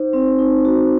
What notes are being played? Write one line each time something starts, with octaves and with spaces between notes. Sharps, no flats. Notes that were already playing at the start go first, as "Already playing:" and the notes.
Already playing: D#4 C5
C4
D#4
F#4